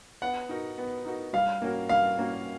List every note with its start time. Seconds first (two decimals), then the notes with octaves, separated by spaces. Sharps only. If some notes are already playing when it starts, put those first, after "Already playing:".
0.22 B3 F#5
0.49 D#4 F#4 A#4
0.78 B3
1.06 D#4 F#4 A#4
1.33 G3 F5
1.61 A#3 C#4 F#4 A#4
1.89 G3 F5
2.18 A#3 C#4 F#4 A#4